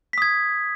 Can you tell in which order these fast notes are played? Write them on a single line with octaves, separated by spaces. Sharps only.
B6 D#6 G#6